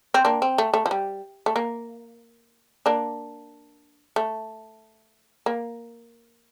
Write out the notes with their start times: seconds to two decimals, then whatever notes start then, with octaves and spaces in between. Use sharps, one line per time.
0.14 C4
0.25 A#3 D4
0.42 C4
0.58 A3
0.74 A3
0.86 F3
0.91 G3
1.46 A3
1.56 A#3
2.86 A#3 D4
4.16 A3
5.46 A#3